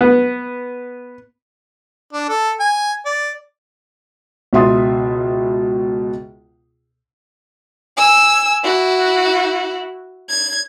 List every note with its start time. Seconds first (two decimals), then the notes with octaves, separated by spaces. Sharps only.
0.01 B3
2.13 D4
2.29 A4
2.60 G#5
3.05 D5
4.53 C#2 B2 E5 C6 D#6 A6
7.96 G#5 E6
8.64 E4 F#4
10.29 G#6